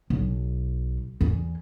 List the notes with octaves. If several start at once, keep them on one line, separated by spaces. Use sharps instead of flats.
B1
E2